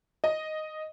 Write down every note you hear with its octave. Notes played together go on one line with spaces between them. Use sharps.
D#5